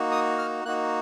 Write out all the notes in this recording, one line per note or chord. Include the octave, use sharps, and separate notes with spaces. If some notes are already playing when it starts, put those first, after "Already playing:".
Already playing: A#3 D#4 F#4
D#6
F6
A#3 D#4 F#4 F#6